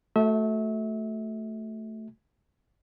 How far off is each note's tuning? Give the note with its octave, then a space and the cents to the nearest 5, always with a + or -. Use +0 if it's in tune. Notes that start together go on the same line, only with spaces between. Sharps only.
A3 +0 F#4 +0 E5 -30